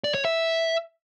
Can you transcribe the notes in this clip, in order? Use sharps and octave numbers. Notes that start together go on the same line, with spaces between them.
D5
C#5
E5